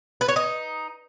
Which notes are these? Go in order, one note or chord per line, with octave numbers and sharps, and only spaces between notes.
B4
C#5
D#4